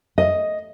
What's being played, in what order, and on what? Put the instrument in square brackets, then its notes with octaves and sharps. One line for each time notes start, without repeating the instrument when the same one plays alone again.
[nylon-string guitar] D#5